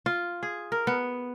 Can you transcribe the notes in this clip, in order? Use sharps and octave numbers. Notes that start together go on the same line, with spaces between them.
F4
G#4
A#4
B3